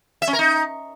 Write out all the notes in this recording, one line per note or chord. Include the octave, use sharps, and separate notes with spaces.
E5
C#4
A#4
D#4